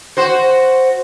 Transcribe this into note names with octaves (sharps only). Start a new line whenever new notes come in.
F#4 C5